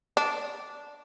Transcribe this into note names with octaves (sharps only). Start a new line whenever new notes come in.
D4